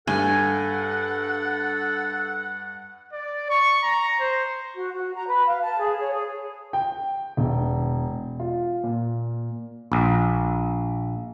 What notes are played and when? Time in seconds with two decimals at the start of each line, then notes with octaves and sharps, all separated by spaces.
0.07 G2 A4 F#5 G#5
3.13 D5
3.50 C#6
3.83 A#5
4.20 C5
4.75 F#4
4.94 F#4
5.14 A#5
5.27 B4
5.46 F5
5.62 A5
5.79 G#4
6.00 C#5
6.12 G#4
6.73 G5
7.37 E1
8.40 F4
8.84 A#2
9.92 A#1